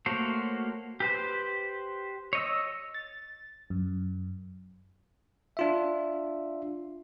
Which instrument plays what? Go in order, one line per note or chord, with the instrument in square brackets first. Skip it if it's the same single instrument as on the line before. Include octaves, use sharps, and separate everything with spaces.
[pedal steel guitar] A3 A#3 F#4 C5 C#5
G4 B4 C5
C#5 D#5 E6
[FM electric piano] A6
F#2
[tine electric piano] D4 F4 E5